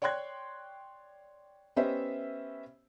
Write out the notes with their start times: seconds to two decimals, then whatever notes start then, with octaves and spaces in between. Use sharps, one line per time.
0.02 C#5 D5 G5 C6 F#6 G#6
1.76 B3 C#4 G4 C5 D#5 E5